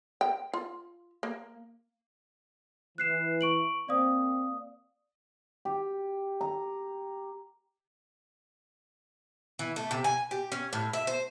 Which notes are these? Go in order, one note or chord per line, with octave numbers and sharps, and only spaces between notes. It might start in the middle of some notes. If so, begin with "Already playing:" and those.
G5
F4
A#3
E3 F#6 C7 E7
C#6 D7 F#7
A#3 C4 D5 F5 D#6
G4
A#5
E3
A3
C3
G#5
G4
C#4
A2
E5
C5